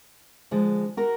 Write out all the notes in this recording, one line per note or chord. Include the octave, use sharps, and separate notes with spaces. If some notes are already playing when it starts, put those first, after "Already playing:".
D3 F3 G#3
F#4 A#4